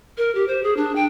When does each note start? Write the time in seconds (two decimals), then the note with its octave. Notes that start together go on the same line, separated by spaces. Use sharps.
0.18 A#4
0.35 G4
0.48 C5
0.63 G#4
0.77 D4
0.95 G5